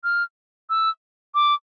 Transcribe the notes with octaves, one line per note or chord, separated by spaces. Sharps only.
F6
E6
D6